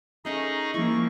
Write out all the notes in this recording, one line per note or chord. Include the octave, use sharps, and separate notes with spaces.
A3 C#4 D#4 G#4 A#4 D#5
F3 A#3 E4 C#6